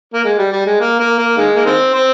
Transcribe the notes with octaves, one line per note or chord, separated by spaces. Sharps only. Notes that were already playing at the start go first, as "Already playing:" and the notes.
A#3
G#3
G3
G3
G#3
A#3
A#3
A#3
D#3 G#3
A#3
D#3 G#3 C4
C4